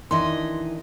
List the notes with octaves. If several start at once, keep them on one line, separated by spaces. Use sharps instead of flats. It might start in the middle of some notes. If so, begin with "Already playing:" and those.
D#3 E3 D4 D#5 C6